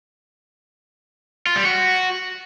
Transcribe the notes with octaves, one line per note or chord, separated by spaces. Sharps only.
F4
G3
F#4